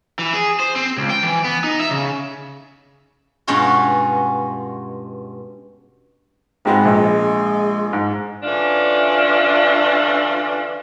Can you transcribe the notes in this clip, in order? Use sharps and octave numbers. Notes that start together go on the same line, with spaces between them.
E3
G#4
C5
C4
C#2
G5
E3
B3
D#4
E5
C#3
G2 B2 G#3 C#4 F4 F#4
G#2 G#3 B3 C4
A#1 G#3
G#2
D3 E3 C#4 D4 F4